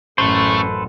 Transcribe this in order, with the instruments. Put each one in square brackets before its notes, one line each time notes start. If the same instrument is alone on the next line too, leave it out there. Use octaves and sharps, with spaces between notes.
[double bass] A1 F#2 [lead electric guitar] A3 [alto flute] C#4 [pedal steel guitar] A4 B4 C5